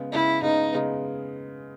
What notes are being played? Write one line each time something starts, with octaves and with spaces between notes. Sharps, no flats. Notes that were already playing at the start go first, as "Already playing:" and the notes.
Already playing: C#3 G#3 B3
C#3 G#3 B3 E4
C#3 G#3 B3 D#4
C#3 G#3 B3